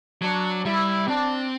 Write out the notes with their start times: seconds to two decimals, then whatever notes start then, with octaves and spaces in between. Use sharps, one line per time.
0.22 F#3 D4
0.65 G3 E4
1.08 C4 D4